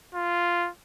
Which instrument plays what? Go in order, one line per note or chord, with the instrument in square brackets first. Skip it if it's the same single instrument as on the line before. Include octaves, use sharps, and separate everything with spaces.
[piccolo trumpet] F4